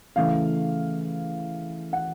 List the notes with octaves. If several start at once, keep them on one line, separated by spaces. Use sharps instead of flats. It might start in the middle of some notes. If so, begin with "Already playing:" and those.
C#3 E3 A3 F5
F#5